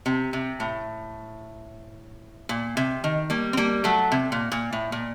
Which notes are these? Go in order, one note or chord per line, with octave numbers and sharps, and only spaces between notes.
C3
C3
A2
A#2
C3
D#3
G3 A#3
C4
G3 A#3
F#3 A3
C3
A#2
A#2
A2
A#2